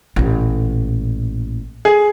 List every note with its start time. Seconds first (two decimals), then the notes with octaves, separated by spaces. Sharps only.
0.16 A1 A#2
1.85 G#4